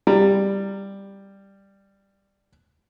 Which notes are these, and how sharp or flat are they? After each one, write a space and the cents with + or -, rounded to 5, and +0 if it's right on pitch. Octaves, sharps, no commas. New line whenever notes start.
G3 +5 A#5 -15